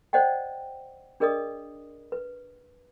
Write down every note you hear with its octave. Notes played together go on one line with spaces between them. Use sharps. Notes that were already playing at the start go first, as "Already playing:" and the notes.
C5 D5 D#5 F#5 G5
D4 G#4 A#4 D5 D#5 D#6
B4